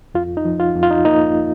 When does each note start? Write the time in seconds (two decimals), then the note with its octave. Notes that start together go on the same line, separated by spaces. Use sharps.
0.14 F2 F4
0.37 D#4
0.45 F3
0.60 F4
0.75 F2
0.83 F4
0.91 D#4
1.05 A#3 D#4